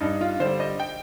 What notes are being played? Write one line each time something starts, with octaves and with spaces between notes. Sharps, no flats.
G2 D#4
F4
D3 G3 C5
D#5
G5